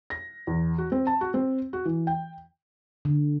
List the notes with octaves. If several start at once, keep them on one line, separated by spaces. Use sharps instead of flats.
A#6
E2
F#4
C4
A5
F#4
C4
F#4
E3
G5
D3